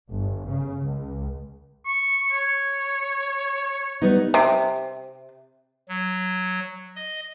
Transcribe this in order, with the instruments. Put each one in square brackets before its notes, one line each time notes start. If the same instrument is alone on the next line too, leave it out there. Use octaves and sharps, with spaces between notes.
[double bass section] G1
C#3
C#2
[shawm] C#6
C#5
[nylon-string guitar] G3 B3 D#4
[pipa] C3
[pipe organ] F#3
D#5